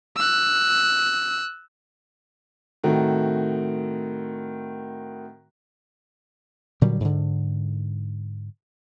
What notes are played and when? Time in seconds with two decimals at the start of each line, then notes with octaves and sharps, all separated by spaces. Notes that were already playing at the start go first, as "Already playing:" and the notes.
0.16 E6 F#6
2.83 A2 D#3 A3 C4 F#4
6.81 A#2 D3 F#3 G3
7.00 G#2 D3